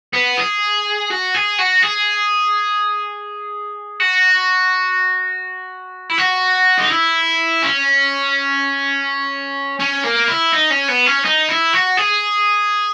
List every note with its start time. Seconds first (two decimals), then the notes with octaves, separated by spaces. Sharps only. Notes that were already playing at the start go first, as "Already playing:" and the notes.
0.13 B3
0.37 G#4
1.10 F#4
1.34 G#4
1.58 F#4
1.82 G#4
4.00 F#4
6.10 E4
6.18 F#4
6.78 D#4
6.90 E4
7.63 C#4
9.80 C#4
10.04 A#3
10.28 E4
10.52 D#4
10.71 C#4
10.89 B3
11.07 C#4
11.25 D#4
11.48 E4
11.73 F#4
11.97 G#4